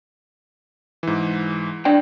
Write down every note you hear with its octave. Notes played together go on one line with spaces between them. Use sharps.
G#2 E3
D4 D5 G5